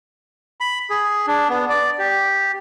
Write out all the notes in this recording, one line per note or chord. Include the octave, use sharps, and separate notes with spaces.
B5
G#4
D4
B3
D5
G4